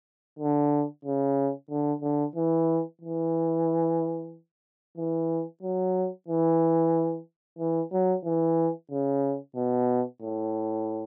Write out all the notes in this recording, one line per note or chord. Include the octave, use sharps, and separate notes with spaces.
D3
C#3
D3
D3
E3
E3
E3
F#3
E3
E3
F#3
E3
C#3
B2
A2